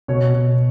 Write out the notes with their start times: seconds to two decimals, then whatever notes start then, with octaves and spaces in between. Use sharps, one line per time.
0.08 B2 C#5
0.34 B2